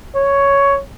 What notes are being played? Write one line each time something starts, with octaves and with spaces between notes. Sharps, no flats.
C#5